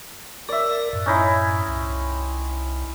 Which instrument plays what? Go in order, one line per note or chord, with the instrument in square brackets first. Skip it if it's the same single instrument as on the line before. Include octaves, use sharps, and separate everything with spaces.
[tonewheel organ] A#4 [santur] D5 E5
[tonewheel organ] F#2 A2
[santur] C#4 D#4 E4
[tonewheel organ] C2